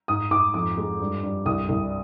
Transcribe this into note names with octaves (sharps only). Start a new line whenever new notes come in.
G#2 D#6
G#2 D6
F2 D6
G#3
G2
G2
C2 D#6
C2